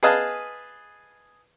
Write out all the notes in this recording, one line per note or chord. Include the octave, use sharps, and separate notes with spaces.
G#4 B4 D#5 F5 G#5 A5